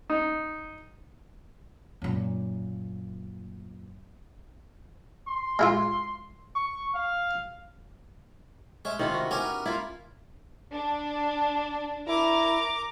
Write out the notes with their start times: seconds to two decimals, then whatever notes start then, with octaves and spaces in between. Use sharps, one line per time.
0.10 D#4
2.02 F#2 A#2
5.27 C6
5.59 G#3 E4 F4
6.55 C#6
6.94 F5
8.85 G#3 C#4 E5
8.99 C3 D#3 E4 F4
9.14 F#4
9.31 B3 C#4 G4 A#4
9.66 A#3 E4 F4
10.73 D4
12.07 E4 A#4 D6